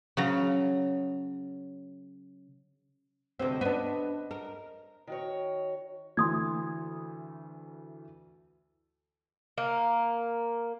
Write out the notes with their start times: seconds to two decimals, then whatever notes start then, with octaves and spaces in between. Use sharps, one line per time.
0.17 C#3 F#3 A#5
3.39 D2 C3 C4 C5 D#5
3.61 B3 D4
4.31 A#4
5.07 D#3 F#4 C#5
6.17 D2 E3 A3 C6 D#6 G#6
9.58 A#3